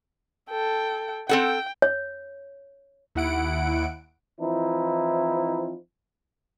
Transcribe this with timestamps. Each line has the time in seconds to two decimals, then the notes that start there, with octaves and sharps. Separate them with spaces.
0.50 A4 G5
1.29 C4 A4 F#5 G5
1.82 C#5
3.15 D#2 E4 F#5 D7
4.39 E3 F3 C4 D#4 E4